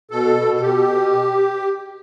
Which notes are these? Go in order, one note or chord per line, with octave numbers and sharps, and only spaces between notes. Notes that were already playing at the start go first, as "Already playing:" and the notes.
B2 A4
B2
A4
B2 G4
B2